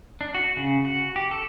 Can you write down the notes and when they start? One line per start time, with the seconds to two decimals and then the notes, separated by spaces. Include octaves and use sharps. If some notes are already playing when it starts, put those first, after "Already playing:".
0.21 D4
0.35 F#4
0.57 C#3
0.85 F#4
1.16 G4
1.31 A4